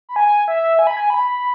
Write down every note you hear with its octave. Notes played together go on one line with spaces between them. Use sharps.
B5
G#5
E5
G#5
B5
G#5
B5